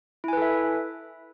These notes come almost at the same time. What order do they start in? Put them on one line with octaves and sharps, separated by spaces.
E4 G#5 B4 A4 E5